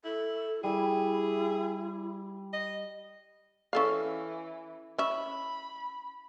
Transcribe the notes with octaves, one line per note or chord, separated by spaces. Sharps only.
E4 A4
G3 E4 G#4
D#5
E3 C#4 A4 F5
C#4 E5 B5